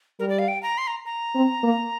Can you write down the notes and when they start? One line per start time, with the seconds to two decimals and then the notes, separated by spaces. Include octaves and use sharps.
0.19 G3 A#4
0.29 D5
0.39 F5
0.48 G5
0.63 A#5
0.78 C6
0.87 A#5
1.05 A#5
1.35 C4
1.63 A#3